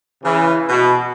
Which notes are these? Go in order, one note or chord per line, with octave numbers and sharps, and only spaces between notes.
C#3 E3
B2